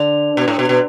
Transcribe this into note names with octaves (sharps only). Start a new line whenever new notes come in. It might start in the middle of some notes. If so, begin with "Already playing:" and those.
Already playing: D3
B2
A2
B2
B2